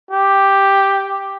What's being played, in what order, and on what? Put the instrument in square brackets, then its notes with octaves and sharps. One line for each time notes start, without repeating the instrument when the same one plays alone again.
[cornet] G4